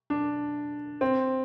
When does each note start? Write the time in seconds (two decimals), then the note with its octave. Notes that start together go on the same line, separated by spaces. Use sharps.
0.10 D4
1.01 C4